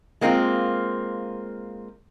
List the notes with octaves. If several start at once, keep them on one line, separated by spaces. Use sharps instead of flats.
G#3 A#3 C4 D#4 F4